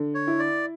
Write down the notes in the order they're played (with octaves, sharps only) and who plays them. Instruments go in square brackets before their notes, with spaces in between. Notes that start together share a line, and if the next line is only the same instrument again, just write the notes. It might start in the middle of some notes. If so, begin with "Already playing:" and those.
Already playing: [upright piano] D3
[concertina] C#5
[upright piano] E4
[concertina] D5